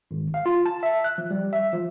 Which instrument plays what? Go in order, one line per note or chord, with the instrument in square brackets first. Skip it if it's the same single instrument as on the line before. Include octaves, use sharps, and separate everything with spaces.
[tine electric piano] G#1
F5
F4
A5
E5
F#6
F3
G3
E5
F3